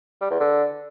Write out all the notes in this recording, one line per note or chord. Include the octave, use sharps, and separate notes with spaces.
G3
E2
D3